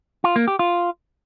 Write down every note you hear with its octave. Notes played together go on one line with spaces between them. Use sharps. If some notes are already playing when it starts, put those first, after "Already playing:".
F4
A#3
G4
F4